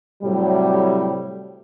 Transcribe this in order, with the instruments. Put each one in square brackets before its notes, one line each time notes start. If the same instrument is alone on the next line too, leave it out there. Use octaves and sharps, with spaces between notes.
[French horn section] A2 C3 F#3 G3